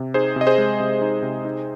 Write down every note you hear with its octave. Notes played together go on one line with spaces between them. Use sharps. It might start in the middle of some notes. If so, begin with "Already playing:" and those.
Already playing: C3
D#4 G#4 C5
C3 D#5
G#4 C5
G#3
C3
D#4
C3
D#4